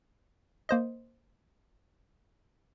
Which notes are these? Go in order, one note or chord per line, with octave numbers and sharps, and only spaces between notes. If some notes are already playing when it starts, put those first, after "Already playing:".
A#3 C5 D#5